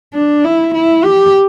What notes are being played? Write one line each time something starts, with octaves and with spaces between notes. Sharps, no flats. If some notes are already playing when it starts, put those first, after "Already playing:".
D4
E4
E4
G4